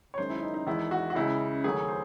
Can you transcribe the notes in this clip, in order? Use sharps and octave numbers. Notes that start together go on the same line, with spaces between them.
C#5
F#2 D#3 G#3 C5
E4
D#4
D#4
E2 D#3 G#3 E4
F#4
F#4
C#2 C#3 G#3 E4
D#2 C#3 F#3 A3 G#4
C5